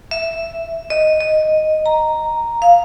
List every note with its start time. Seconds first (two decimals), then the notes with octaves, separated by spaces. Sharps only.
0.11 E5
0.90 D#5
1.21 D#5
1.86 A#5
2.62 F5